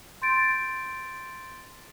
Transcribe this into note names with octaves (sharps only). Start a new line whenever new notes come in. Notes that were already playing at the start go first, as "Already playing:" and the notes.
C6 G6 A6 D7